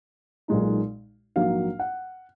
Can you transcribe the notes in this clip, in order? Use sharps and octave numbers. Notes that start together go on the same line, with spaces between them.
B1 A#2 G#3 D#4
A#1 G#2 F#3 A#3 F5
F#5